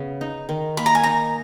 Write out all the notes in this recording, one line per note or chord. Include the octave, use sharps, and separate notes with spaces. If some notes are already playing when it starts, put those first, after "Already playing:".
Already playing: C#3 B3
D#4
D#3
A#3 B5
A#5
G#5
D#4 A#5